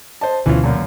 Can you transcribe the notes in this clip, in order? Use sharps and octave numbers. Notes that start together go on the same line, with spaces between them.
C5 D#5 A5
D2 B2 D3 E3 C#4 F4
F#2 A#2